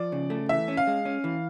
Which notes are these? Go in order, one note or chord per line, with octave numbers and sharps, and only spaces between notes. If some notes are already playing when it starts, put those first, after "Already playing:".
Already playing: F3 D5
C#3
A3
E3 E5
C#4
F5
G#3
C#4
E3